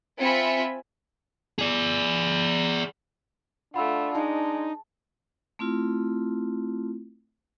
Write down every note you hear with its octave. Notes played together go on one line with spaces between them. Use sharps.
C4 F4 E5 G#5 B5 C#7
G#4 D5
A3 D4 F4 F#5 B5 E6
G#3 D#4 A5
A3 C4 E4 F4